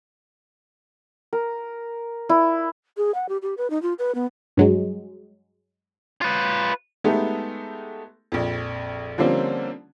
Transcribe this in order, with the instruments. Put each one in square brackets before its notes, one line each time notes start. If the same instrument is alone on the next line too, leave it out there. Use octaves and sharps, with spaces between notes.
[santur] A#4
E4
[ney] G#4
F#5
G4
G4
B4
D#4
F4
B4
B3
[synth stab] G2 F#3 G#3
[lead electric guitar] F4 B4
[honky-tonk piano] G#3 A3 B3 D#4 G4 A4
A#1 F2
D3 F3 G3 A#3 C4 C#4